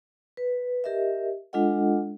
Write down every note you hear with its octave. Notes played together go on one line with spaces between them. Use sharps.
B4
G4 A#4 D#5 E5
G#3 D4 F4 A4 D#5 F#5